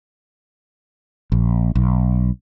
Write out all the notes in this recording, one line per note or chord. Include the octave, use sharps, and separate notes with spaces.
A#1
B1